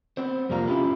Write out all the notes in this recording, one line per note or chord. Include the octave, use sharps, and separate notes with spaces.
B3 C4 C5
F2 C3 G3 A#3 F4 A#5
C#4 D4 E4 F4 G4 B4